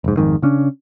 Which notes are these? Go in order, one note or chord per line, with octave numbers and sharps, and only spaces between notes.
F1 G#2
G#1 F2 G#2 D#3
C#3 C#4 D4